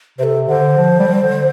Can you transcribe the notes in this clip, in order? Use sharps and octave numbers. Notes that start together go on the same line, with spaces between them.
C3 A4 C5
D3 C5
F3
G3
F3
G3
D3